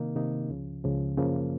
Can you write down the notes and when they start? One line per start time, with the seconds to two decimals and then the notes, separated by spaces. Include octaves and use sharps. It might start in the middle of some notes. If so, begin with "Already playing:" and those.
Already playing: C3 D#3 A#3 D#4
0.16 C3 D#3 A#3 D#4
0.49 C#2 C#3 F3
0.84 C#2 C#3 F3
1.18 F#2 C#3 F3 A#3